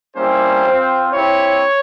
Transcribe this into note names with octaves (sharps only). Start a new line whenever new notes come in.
G3 A#3 C#4 E4 G4 C5
C4 F4
C4 E4 G4 C#5